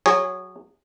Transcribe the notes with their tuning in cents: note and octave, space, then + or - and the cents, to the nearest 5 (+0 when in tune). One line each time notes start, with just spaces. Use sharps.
F#3 +0 G#4 -20 C#5 +0